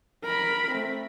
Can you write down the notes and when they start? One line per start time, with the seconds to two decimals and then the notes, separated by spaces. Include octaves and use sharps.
0.24 A#4 B5
0.72 A3 C4